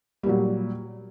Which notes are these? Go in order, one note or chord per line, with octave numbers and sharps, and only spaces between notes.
A#2 F#3 G3